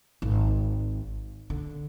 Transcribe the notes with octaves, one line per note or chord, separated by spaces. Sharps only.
G#1
D3